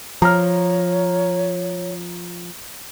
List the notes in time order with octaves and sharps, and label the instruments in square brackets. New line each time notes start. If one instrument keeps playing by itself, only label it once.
[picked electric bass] F3 [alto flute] C#5 [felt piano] A#5 F6